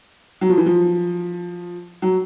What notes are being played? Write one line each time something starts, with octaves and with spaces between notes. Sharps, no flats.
F#3
F3
E3
F3
F#3